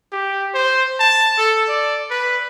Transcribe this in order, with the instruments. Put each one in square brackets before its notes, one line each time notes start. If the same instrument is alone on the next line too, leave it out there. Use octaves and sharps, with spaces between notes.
[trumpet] G4
C5
A5
A4
D5
B4